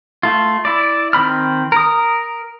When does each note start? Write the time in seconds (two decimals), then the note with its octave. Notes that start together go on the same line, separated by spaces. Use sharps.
0.23 A3 F4
0.65 E4 D5
1.13 D#3 C4 B5 F6
1.72 A#4 D#6